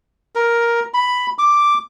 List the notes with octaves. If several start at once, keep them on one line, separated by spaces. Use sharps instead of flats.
A#4
B5
D6